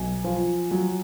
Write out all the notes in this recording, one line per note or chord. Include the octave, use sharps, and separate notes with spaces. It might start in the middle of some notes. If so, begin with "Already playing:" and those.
Already playing: B1 G#5
F3
F#3